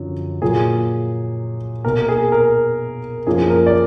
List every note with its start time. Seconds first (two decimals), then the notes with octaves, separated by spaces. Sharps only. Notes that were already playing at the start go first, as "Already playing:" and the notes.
Already playing: F#2 D3 F3
0.42 A#2 F#3 A#3 G#4
1.85 B2 A#3 A#4
1.99 A#4
2.09 G#4
2.32 A#4
3.27 F#2 F3 A#3 G#4
3.50 A#4
3.67 D5